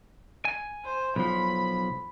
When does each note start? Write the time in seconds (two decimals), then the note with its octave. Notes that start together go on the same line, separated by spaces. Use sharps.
0.45 G#5
0.85 C5
1.16 B1 F3 B5